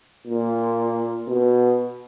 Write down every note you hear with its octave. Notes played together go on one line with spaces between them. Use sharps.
A#2
B2